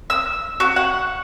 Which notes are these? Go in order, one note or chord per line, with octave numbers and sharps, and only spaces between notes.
E6
F#4
F#5